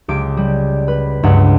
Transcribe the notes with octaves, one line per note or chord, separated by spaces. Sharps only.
C#2 G4 D6 D7
G3
B4
C#2 G2 F#5